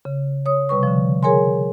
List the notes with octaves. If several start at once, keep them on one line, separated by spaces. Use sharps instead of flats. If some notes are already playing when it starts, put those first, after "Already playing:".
C#3
C#5 D#6
C3 G3 B4 C#6
D3 F3
G#4 A#4 C#5 G#5 C6